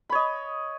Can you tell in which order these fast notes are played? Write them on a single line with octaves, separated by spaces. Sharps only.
B5 C#5 D#5